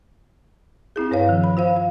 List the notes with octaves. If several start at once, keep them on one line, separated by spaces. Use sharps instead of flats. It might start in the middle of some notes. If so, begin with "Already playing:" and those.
C4 E4 G#4
G2 B4 C#5 F5
D#3 F3
B5
F4 C5 F5
F5